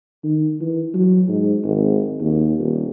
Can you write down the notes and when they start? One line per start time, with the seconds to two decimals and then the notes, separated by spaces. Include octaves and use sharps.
0.23 D#3
0.61 E3
0.94 F#3
1.28 G#2
1.64 G#1
2.20 D#2
2.59 D#1